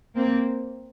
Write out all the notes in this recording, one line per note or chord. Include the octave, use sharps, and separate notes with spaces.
A#3 C4